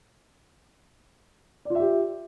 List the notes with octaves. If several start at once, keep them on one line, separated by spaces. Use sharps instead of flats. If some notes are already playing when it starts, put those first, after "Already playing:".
F4 G4 D5 E5